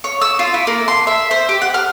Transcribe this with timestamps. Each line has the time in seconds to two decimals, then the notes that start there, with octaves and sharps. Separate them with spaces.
0.04 C#5
0.22 E6
0.39 F4
0.54 E4
0.67 A#3
0.88 C6
1.07 E5
1.31 C5
1.49 G4
1.62 F#5
1.74 F6